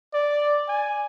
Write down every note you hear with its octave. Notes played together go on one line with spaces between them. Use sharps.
D5
G#5